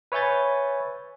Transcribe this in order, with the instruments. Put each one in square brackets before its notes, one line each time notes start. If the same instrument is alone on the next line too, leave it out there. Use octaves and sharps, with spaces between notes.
[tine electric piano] B4 C#5 E5 G#5 G6 A6